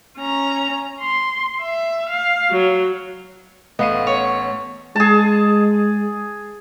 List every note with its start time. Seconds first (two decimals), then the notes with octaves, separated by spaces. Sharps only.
0.17 C#4 A#5
1.01 C6
1.61 E5
2.09 F5
2.50 F#3
3.79 A1 A3 B3 D#5 F5 C7 D#7
4.07 C#5 F#5
4.96 G#3 G#4 A5